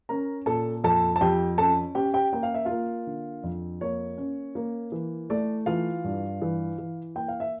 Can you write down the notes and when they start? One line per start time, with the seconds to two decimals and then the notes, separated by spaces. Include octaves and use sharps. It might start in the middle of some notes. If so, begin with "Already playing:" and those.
0.09 C#4 A#4 A#5
0.46 A#2 A4 A5
0.84 F2 A4 A5
1.16 A5
1.21 F2 G4 G5
1.58 C#4 A4 A5
1.95 C#4 G4 G5
2.13 G4 G5
2.32 A#3 G5
2.43 F5
2.54 E5
2.65 A#3 F4 F5
3.07 D3
3.43 F2
3.81 A#3 C#5
4.18 C#4
4.55 A#3
4.92 E3
5.30 A3 D5
5.66 E3 F4 F5
6.04 G2
6.42 E3
6.78 E3
7.15 A#3 G5
7.28 F5
7.40 E5